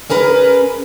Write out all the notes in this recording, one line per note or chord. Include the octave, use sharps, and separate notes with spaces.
C#4 G#4 A#4 B4